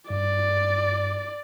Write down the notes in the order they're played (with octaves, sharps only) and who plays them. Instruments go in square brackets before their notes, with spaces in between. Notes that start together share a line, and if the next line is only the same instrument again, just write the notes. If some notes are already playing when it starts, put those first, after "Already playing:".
[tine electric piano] G2 [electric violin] D5